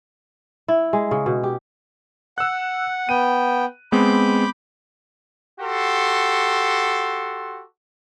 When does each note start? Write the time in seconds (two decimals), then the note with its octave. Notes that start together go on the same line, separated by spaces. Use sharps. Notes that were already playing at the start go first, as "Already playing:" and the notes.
0.68 E4
0.93 G#3
1.11 C#3
1.26 B2
1.43 G4
2.38 F#5 E6 F#6
3.09 B3 G5 D#7
3.92 G#3 B3 C4 B5 D6 G6
5.61 F#4 G4 A4 C6